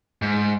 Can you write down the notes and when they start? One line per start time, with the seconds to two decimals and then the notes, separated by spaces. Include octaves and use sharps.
0.22 G#2